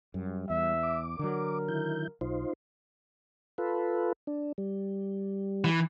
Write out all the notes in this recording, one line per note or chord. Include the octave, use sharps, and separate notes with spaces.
F#2 G3
E2 E5
D6
D3 F#3 A#4
D#3 E4 G6
B1 D#4 F4 C5
F4 A4 B4
D4
G3
E3